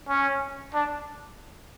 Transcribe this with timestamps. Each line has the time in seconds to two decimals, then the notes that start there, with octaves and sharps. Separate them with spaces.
0.08 C#4
0.74 D4